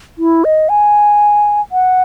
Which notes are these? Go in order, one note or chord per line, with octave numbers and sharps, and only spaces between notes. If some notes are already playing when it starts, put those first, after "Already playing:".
E4
D#5
G#5
F#5